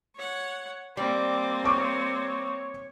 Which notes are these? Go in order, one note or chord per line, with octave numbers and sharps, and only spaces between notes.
C#5 F#5
G3 A#3 C4 D6
C#5 C#6 D6